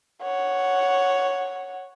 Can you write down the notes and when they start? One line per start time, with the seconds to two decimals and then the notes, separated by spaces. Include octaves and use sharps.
0.23 C#5 F#5